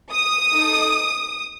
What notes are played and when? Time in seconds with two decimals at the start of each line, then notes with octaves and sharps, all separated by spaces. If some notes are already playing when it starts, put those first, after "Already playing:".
0.12 D#6
0.52 D#4 A4